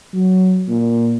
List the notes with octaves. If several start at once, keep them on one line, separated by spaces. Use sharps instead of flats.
F#3
A#2